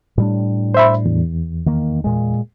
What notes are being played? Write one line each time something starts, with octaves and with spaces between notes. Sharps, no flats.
A2 G3 D4
C5 E5 B5
E2
D#3 A#3
A#2 G#3